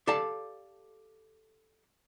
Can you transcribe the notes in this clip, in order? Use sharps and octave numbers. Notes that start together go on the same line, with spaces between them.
G4 A4 D5 F5 A5